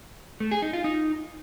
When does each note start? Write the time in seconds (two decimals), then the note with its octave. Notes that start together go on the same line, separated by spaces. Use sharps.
0.40 A3
0.51 G#4
0.62 D#4
0.73 F4
0.84 D#4